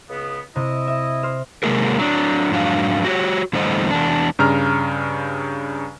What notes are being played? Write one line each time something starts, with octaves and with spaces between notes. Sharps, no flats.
C#2 C#3 B3
C3 E4 D#5
E5
C5 F6
C3 F#3 G#3 A#3 G#4 A#4
F#3 D4
F2 G#2 F#3 D4 F5
F#4 G4 C#5
E2 A2 D3 G3 C5 D#5
E2 D4
G2 C#3 A#5 F6